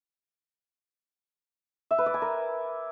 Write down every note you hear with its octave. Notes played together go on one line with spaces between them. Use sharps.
E5
B4
D5
G#5
A#4